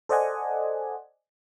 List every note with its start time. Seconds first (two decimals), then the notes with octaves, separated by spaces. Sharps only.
0.09 A4 C5 D5 D#5 F#5 G#5